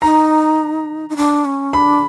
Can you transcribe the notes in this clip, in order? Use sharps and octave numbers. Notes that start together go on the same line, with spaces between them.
D#4 A#5
D#4
D4
C#4
D4 B5